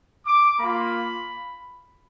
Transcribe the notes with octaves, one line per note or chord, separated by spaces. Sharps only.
D6
A#3 F4 B5